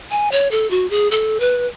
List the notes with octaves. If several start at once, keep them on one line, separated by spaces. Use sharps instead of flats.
G#5
C#5
A4
F#4
G#4
A4
B4